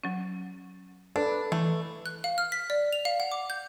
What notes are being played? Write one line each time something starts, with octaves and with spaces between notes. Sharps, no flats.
F#3 C#4
D4 A4 B4
E3 A3
F#6
F5
F6
B6
D5
F7
F5
F#5
D6
G6